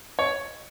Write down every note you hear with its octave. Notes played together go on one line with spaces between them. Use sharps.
C#5